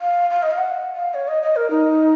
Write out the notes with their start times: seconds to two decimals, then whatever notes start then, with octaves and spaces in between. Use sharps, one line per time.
0.01 F5
0.30 F5
0.42 D#5
0.51 F5
0.58 F#5
0.95 F5
1.14 C#5
1.28 D#5
1.42 D#5
1.56 A#4
1.70 D#4